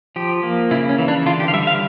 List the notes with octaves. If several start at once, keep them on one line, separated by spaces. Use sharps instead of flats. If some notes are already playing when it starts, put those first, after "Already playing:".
F3 G4
A#3
C#3 E4
C#4
E3
D4
D3 F4
G4
F5
G3 E5
F5